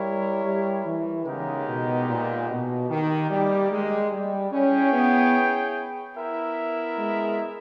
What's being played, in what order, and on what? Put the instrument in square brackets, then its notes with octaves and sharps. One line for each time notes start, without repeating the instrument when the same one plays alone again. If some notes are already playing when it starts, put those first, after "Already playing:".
Already playing: [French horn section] G3 [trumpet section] E4 A#4 C#5
[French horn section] G3
E3
[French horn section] C#3 [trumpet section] G#3 B3 D#4 G4 A#4
[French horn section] B2
A#2
B2
[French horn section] D#3 [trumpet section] A#3 D#4 G4
[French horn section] G3
G#3
G3
[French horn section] C#4 [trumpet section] E4 G#4 C#5 G5
[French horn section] B3
[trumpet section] B3 E4 A#4 E5
[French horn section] G#3